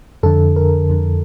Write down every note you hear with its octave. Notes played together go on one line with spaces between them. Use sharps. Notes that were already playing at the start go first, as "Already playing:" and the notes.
F2 D3 A4
A#4
F2 D3